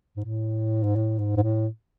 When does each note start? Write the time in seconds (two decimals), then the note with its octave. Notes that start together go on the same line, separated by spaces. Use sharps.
0.17 G#2
0.24 A2
0.83 G#2
0.96 A2
1.19 G#2
1.37 G#2
1.42 A2